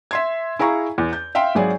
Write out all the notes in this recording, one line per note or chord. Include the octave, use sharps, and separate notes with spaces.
E5 C6 G#6
E4 G#4 F5 A#5 C#6
E2
G6
E5 F5 G5 C6
G#1 F#3 G#4 D5